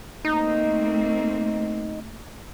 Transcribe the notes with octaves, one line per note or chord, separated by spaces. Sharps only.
A3 A#3 C4 D#4